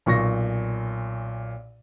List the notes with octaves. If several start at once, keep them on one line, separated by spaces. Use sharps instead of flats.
B1 A#2 C#6 A#6